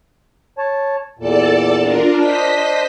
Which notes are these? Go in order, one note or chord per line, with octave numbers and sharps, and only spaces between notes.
C#5 A5
E2 A#2 A4 D5 A5
D4 F4 A#4
D4 C5 D#5 B6